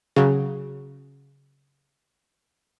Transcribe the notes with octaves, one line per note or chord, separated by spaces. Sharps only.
C#3 F#3